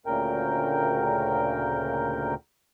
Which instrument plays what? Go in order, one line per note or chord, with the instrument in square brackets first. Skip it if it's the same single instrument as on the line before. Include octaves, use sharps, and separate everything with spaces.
[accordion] D2 A#2 C#3 A#4 G5